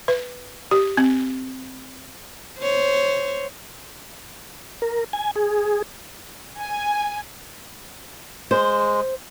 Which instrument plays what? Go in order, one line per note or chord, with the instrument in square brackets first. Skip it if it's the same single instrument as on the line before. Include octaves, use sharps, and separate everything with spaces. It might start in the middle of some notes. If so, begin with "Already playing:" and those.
[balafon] B4
G4
C4
[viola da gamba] C5 C#5
[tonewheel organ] A#4
G#5
G#4
[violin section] G#5
[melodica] G#3 [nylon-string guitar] C5